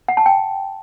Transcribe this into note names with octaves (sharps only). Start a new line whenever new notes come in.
F#5
A5
G5